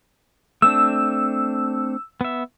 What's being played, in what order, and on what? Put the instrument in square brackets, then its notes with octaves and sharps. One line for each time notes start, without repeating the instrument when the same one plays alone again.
[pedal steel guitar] A3 C4 D4 [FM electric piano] E6
[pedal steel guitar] B3 E5